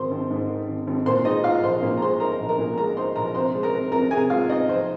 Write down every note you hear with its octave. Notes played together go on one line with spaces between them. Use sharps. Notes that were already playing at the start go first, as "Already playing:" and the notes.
Already playing: G#1 G#2 D#3 A#4 C5 C6
G#1
G#2
D#3
G#1
G#1
A#2 C5 C6
G#3 D#4 D#5
D#4 F4 F5
A#1 C5 C6
A#2
A#5
G#3 C5 C6
D#4 A#4 A#5
A#1
A#4 A#5
A#2
G#3 A#4 A#5
D#4 C5 C6
A#1 A#4 A#5
C3 C5 C6
G#3
A#4 A#5
C4
F2 A#4 A#5
C3 G#4 G#5
G#3 F4 F5
C4 D#4 D#5
F2 C4 C5